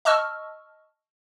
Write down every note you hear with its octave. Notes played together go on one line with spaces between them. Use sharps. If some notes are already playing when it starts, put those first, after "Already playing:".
D#5 A5 C#6 E6 F6